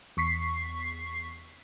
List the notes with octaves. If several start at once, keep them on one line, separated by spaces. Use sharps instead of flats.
E2 C#6 B6 C7